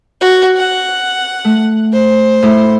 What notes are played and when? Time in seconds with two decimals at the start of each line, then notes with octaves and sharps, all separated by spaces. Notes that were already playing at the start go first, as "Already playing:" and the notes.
0.21 F#4
0.57 F#5
1.45 A3
1.92 C5
2.43 A2 E4